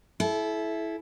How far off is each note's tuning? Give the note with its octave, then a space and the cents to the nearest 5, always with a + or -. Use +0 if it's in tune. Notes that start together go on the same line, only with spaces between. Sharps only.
E4 +0 A4 -35